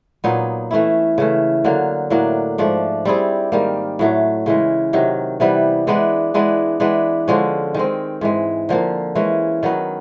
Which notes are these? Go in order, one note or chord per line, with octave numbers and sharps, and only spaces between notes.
A#2 F#3 B3 D#4
E3 A3 C#4 E4
C#3 E3 A3
D3 F#3 A#3
A2 F#3 A#3 D4
G#2 F3 A3 D4
G3 C4 E4 G#4
G#2 D#3 G3 A#3
A2 F#3 A3
C#3 E3 G#3
C3 D#3 F#3
C3 E3 G3 B3
E3 G#3 B3 D4
E3 G#3 B3 D4
E3 G#3 B3 D4
D3 F3 G#3 C#4
D#3 G#3 C4
G#2 E3 G#3
D3 F3 A#3
E3 G#3 C#4
D#3 F#3 B3